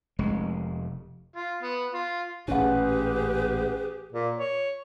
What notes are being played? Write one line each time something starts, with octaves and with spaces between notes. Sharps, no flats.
F1 G#3
F4
B3
F4
A1 A#2 C#4 G4 G#4 B4 F#5
A#2
C#5